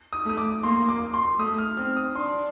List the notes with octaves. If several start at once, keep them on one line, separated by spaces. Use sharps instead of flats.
D#6
A3 D#6
D6
A#3 C6
D6
C6
A3 D#6
F6
C4 F6
D#6
D4 C6